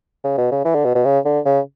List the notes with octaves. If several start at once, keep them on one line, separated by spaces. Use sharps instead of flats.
C#3
B2
C#3
E3
D3
B2
B2
C#3
D3
C#3